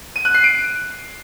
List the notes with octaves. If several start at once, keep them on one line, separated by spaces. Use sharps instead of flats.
D#7
F#6
C7
D7